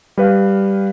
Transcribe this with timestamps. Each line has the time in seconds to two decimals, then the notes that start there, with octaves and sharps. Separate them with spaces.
0.17 G3 B4 F5